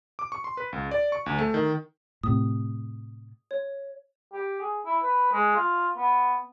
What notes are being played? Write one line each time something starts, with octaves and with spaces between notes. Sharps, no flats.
D6
C#6
C6
B4
C#2
D5
C#6
D2
A3
D#3
A2 C3 D#6
C#5
G4
G#4
E4
B4
G#3
F4
B3